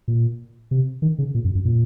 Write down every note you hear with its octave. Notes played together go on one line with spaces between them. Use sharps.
A#2
C3
D#3
C#3
A#2
F#2
F#2
A#2